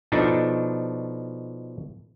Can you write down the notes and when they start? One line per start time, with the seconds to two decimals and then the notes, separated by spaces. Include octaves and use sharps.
0.12 B2 F3 D4 D#4 A4